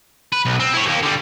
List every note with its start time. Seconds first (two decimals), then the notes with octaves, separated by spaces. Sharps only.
0.32 B4
0.45 B1
0.60 C4
0.73 E4 C#5
0.85 D#2 A#3
1.03 D3 G3